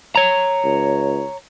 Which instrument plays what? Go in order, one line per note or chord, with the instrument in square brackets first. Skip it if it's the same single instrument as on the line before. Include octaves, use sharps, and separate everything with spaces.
[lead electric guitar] C#5 A#5
[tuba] C#2